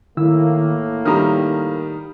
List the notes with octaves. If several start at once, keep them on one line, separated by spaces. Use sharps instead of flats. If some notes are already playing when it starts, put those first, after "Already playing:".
A2 D#3 A#3 E4 E6
D#3 G3 A#5 D#6 F6